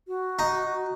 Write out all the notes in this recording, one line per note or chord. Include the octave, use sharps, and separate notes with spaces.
F#4
D#4